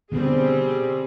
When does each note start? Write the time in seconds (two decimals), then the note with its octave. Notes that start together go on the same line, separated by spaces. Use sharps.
0.12 B2 D3 G3 B3 C4 G#4